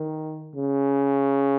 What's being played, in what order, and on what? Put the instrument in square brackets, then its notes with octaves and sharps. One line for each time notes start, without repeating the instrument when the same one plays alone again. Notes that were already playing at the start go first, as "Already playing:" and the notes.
Already playing: [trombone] D#3
C#3